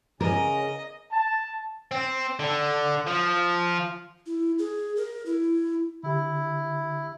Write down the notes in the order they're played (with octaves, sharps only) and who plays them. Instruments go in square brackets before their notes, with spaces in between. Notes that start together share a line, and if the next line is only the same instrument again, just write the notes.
[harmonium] C#3 C#4 [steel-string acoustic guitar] A#4 [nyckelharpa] D#5
[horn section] A5
[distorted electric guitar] C4
D3
F3
[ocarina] E4
G#4
A#4
E4
[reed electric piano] D3 G4 [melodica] E4